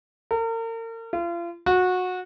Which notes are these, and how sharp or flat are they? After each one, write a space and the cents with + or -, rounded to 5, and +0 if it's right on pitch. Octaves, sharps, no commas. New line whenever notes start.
A#4 -40
F4 -35
F#4 -20